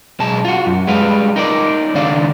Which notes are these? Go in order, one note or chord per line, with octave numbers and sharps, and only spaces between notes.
B1 G#3 A5
F4 F#4
F#2
G3 G#3 B4 F5
D#4 A#4 D5
C#2 D#3 D4 D5 F5